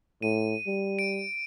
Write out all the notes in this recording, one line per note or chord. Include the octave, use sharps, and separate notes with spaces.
A2 D#7
G3
D7